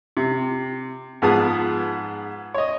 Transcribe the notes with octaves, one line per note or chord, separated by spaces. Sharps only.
C3
G#2 F3 B3 G#4 A5 D#6
C#5 D#5